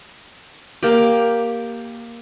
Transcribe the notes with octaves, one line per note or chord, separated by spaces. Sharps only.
A#3 G4